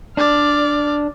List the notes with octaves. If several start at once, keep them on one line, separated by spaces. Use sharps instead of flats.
D4 D5 F6